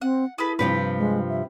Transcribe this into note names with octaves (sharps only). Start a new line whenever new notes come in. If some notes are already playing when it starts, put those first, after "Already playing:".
C4 F#5
E4 G#4 A4 B4
G2 C3 F3 B4
G#3
E5